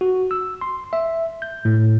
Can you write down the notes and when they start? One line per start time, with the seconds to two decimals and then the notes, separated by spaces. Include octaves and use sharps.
0.01 F#4
0.31 E6
0.61 C6
0.93 E5
1.42 G6
1.65 A2